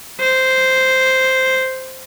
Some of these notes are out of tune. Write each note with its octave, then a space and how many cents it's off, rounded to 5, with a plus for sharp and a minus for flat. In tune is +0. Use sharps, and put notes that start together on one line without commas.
C5 -5